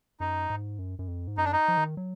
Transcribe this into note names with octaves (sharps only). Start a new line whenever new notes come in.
F#2 D#4
G#2
F#2
F#2
F2
G#2
F#2 D#4
D4
D#4
F3
D#3
F#3